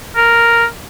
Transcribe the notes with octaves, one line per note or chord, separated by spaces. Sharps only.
A#4